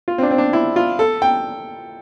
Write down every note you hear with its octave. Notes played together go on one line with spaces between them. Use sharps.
F4
C4
D4
C4
D4
E4
F4
A4
G5